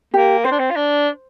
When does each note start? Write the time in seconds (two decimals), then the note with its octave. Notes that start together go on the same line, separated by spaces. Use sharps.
0.14 A#3 G4
0.45 C4 C5
0.52 D4
0.59 C4
0.71 F4
0.76 D4